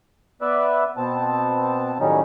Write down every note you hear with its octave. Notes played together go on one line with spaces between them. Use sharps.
B3 B4 D5 E5
B2 B3 C4 A5
A2 D#3 F#3 G3 C#4 D#4